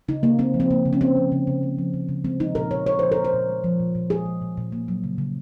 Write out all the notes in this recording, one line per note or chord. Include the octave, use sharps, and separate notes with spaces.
C#3 D#4
C#3 A#3
A#3 C4
F3
C4
C#3 A#3
C#3
C#4
A#3 C4
F3
C#3
C#3
A#3
F3
C#3
C#3
G#3 C4
F3 D#4
A#2 A#4
A#2 C#5
G#3 C#5
F3 C5
A#4
A#2
C5
A#2
G#3
F3
A#2
A#2
G#3 G#4
F3
A#2
A#2
A#3
F#3
C#3
C#3